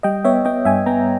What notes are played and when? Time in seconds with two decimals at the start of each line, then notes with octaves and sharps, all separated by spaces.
0.03 G3 D#5 G5
0.24 B3 C#5 E5
0.45 B3 D#5 G5
0.65 G2 E5 G#5
0.86 B3 G5 A#5